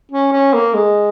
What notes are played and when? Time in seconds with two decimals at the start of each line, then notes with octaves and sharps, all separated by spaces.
0.11 C#4
0.32 C#4
0.53 A#3
0.74 G#3